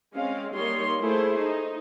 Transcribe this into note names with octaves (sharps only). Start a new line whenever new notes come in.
G#3 C4 C#4 F5
G3 A#3 D#4 C#5 C6
A3 E4 G#4 C5
D#4